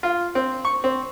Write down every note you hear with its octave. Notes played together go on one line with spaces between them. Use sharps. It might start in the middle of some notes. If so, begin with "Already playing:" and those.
F4
C4
C#6
C4